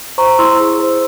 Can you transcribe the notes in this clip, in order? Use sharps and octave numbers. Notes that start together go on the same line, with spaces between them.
C5 A#5 C#6
E4 C6 E6
G#4
C5